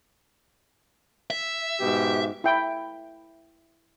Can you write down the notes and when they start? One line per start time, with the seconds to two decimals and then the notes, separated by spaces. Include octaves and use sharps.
1.30 E5
1.80 G#2 B2 G4
2.44 E4 G5